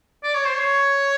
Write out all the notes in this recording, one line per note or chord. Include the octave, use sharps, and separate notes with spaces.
D5
C#5
C5
C#5